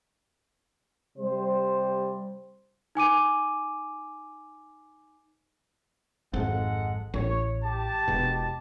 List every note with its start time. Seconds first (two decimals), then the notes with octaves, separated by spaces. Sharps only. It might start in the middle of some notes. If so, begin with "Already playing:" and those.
1.18 C3 G3 C5
2.95 D#4 G#5 D6 D#7
6.34 G#1 F2 G#3 A4 F#5
7.14 A1 C#5
7.64 G4 A5
8.08 E1 B2